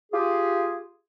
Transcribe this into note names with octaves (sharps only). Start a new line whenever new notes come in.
F4 G4 G#4